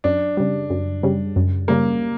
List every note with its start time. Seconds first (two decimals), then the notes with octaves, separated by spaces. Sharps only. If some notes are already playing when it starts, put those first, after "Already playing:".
0.04 F#2 D4
0.37 C#3 G3
0.70 F#2
1.03 C#3 G3
1.36 F#2
1.68 C#3 G3 A#3